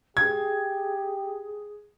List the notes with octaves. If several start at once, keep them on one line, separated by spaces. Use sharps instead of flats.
G4 G#4 G#6